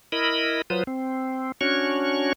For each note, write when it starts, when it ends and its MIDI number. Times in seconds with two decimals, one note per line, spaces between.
0.12 0.62 64
0.12 0.62 70
0.12 0.62 75
0.12 0.62 83
0.70 0.83 54
0.70 0.83 65
0.70 0.83 71
0.70 0.83 72
0.70 0.83 87
0.87 1.52 60
1.61 2.33 61
1.61 2.33 62
1.61 2.33 66
1.61 2.33 73
1.61 2.33 85